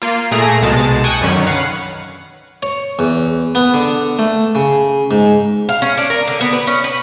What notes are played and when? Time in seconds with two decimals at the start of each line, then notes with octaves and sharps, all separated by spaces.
0.02 A#3 F4
0.31 A#2 A3 G#4 A#5 D7
0.61 C2 B2 G#3 A5
1.04 G5 G#5 C#6 D#6 F#6 G#6
1.21 F#2 D3 D#3 F#3 C#4
1.46 B4 F5 F#5
2.63 C#5
2.99 E2
3.55 B3
3.74 D3
4.19 A3
4.55 C#3
5.11 G#2
5.69 F5
5.82 C#4
5.97 D4
6.10 A#4
6.28 D3
6.41 B3
6.53 B4
6.67 C#4
6.84 B4